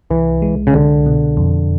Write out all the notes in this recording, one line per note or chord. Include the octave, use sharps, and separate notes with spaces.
C2 E3
G#3
C#3
C2 D3
B2
F2